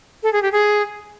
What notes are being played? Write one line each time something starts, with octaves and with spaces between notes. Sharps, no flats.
A4
G#4
G4
G#4